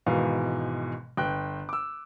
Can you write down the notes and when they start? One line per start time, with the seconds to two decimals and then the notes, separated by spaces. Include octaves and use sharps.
0.06 G#1 G#2 B2 E3 F5
1.17 G1 G5 F#6
1.69 D6 E6